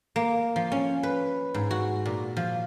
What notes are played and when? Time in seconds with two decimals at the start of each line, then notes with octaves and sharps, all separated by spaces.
0.16 A#3
0.56 F3
0.72 C#4
1.03 B4
1.54 G#2
1.71 F#4
2.06 A#2
2.37 F3